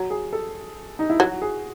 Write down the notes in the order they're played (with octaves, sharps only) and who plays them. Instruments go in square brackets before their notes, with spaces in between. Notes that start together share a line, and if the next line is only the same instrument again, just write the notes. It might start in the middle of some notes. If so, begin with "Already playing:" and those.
Already playing: [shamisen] F#3
[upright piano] G#4
A4
D#4
E4
[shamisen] F#3 [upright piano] F#4
[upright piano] G#4